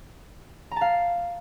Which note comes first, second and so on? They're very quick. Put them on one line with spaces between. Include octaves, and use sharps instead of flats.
A#5 A5 F5